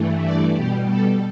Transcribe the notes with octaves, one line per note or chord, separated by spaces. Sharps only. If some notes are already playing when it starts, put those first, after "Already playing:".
Already playing: G2 E3 A3
D5
B2 G3 G4
A4